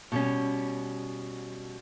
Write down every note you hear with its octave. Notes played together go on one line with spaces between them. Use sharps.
B2 G3 C#4